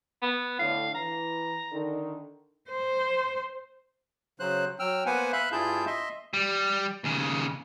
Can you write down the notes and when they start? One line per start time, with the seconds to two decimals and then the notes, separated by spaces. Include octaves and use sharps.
0.22 B3
0.59 A2 D3 F5
0.95 E3 A#5
1.72 D3 D#3 D#4
2.70 C5
4.40 C#3 F#3 C5 F#6
4.79 F#3 G5 E6 F6
5.06 A#3 B3 B4 C5 F#5 G#5
5.33 E5 F5 B5 F#6
5.52 G2 E4 F4 G#4 A5 G6
5.86 D#5 E5 C6
6.34 G3
7.04 D#2 C#3